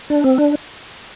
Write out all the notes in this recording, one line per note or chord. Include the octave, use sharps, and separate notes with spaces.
D4
C4
D4